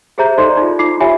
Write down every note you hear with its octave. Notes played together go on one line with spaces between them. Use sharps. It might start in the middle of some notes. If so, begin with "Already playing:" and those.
G4 G#4 C5 E5 A#5 G6
D#4 A4 C5 D5 D#5 C6
D#4 F4
D#4 F4 D6 C7
F4 G4 C#5 E5 G#5 B5